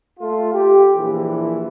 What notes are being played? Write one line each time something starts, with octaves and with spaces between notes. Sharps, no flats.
A3 F4
G4
A#1 E3